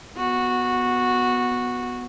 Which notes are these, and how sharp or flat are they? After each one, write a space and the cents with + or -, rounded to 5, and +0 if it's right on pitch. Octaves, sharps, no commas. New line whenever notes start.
B3 +0 F#4 -10